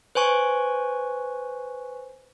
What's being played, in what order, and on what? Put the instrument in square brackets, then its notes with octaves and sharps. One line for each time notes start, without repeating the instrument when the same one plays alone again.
[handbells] B4 C5 G#5 C#6